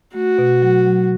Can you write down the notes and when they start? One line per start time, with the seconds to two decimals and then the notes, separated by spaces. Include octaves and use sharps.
0.14 A3 F#4
0.38 B2
0.62 F#3
0.87 F#3